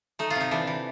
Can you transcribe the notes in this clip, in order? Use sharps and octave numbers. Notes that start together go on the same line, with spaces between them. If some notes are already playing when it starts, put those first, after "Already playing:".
A3 D#4
F4
C3 D#4
E3 D4
E3